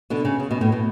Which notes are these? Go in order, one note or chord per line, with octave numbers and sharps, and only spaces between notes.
B2 D3
C#3
C#3
B2
A2
B2